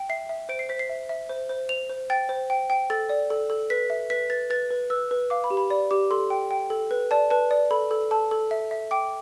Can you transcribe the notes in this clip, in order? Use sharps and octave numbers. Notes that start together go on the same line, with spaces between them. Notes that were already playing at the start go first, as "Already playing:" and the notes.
Already playing: G5
E5 C7
E5
C5 D7
C7
C5 B6
C7
E5
E5
C5
C5
C5 F7
C5
G5 A6
C5
G5
G5
A4 A6
D5
A4
A4
B4 B6
E5
B4 B6
B4 A6
B4 A6
B4
B4 E6
B4
F5 D6
B5
G4
B5
D5 B5
G4 D6
A4 C6
G5
G5
A4
B4
D5 A5
B4 A5
D5
A4 B5
A4
A4 A5
A4
E5
E5
G5 D6